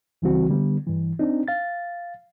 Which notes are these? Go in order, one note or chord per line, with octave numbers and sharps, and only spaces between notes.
C#2 C#3 E3 G3 C4 F#4
D3 G3 B3
G2 E3
C4 D4 D#4
F5 A6